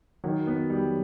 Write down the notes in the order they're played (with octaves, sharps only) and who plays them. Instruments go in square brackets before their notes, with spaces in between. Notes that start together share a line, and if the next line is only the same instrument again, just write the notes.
[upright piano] D#3 [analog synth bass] F#3
[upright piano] B3
G3